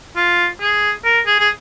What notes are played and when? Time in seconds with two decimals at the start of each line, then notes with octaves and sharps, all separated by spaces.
0.16 F4
0.61 G#4
1.05 A#4
1.26 G#4
1.39 G#4